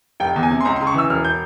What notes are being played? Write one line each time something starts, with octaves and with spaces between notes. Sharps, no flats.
F1 G5
E2
G#5
C3
C6
C#2 A#5
C6
C#3
C#6
E3 E6
E1 F6
G6